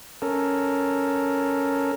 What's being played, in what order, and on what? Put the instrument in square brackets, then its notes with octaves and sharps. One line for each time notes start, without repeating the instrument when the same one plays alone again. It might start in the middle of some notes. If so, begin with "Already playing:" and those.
[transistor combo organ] C#4 A4 A#4